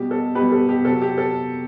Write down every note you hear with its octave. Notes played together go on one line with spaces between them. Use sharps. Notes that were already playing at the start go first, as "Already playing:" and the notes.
Already playing: B2 G3 G4
A4
B2 G3 G4 B4
A4
G4
C3 F#3 A4
G4
A4